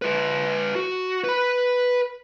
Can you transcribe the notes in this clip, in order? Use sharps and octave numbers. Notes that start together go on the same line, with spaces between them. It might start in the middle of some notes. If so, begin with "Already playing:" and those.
F4 B4
F#4
B4 B5